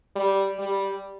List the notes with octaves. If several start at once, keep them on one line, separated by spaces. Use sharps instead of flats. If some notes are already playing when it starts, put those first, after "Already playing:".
G3
G3